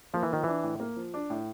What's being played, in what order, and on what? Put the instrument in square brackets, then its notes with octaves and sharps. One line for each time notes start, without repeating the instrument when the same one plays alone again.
[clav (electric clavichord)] F3 [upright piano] A#3
[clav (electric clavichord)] E3
[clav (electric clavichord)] D#3 [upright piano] F3
[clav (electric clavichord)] E3 [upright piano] D4
[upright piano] A2
A#3
F3
D4
A2